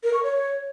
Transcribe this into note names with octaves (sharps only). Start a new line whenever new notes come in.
A#4
C#6
C#5